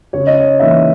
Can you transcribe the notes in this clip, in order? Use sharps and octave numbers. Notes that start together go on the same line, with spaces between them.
C#3 C#5
D#5
C#5
E3 A#3 D#4 E5